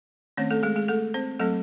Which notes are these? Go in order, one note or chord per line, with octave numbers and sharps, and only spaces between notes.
D#3 A3 C4 C#4 C#5
A3 A4
G#3 G#4
G#3 G#4
A3 A4
C4 C5
F#3 A3 C4 A4